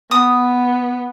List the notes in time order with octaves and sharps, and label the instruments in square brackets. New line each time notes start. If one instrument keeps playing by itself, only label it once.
[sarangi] B3 [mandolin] D#6